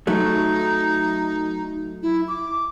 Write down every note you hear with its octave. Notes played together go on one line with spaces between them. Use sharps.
F#3 A3 D#4
E4
D6